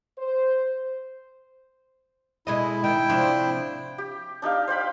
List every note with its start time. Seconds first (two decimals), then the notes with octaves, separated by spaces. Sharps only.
0.18 C5
2.47 B2 G#3 E4 D#5
2.84 D#3 E4 G5
3.09 C3 F3 D4
3.98 G4
4.42 D4 D#4 G4 F5
4.67 C5 F5 G5 B5